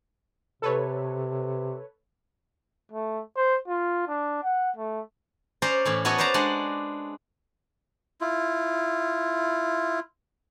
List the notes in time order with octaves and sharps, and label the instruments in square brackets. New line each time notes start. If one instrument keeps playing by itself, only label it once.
[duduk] C3 [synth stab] A4 B4 C#5
[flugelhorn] A3
C5
F4
D4
F#5
A3
[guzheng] C#4 C5 D5 A#5
A2 E3 C#4
B3 F#4 A4 C#5 D#5
B4 C5 D5 A5 A#5
G#3 D4 F#5
[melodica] E4 F4